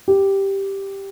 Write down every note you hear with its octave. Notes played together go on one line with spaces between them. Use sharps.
G4